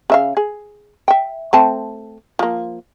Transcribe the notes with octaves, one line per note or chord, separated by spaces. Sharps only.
C#3 E5 F5
G#4
E5 G5
A3 C4 A5
F3 A#3